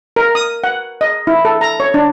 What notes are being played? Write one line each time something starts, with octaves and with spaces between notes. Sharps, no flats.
A#4
D#6
F#5
D#5
E4
A4
A#5
C#5
D4